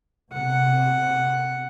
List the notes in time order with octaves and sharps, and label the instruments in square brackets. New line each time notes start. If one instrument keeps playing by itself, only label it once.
[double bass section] C3 [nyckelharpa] F#5